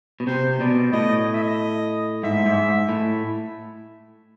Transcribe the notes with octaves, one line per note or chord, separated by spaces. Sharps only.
B2
C3 C5
B2 D5
A2 D#5
D#5
E5
D#5
G#2 E5
G#2
A2